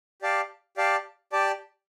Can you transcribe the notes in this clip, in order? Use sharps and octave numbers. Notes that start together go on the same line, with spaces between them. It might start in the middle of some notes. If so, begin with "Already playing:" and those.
G4 D5 F5 A5
G4 D5 F5 A5
G4 D5 A5